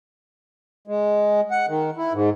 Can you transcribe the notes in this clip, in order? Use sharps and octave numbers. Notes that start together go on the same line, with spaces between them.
G#3
F#5
D#3
E4
G#2